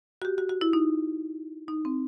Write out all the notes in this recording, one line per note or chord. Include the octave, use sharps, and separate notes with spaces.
F#4
G4
F#4
F#4
E4
D#4
D#4
C4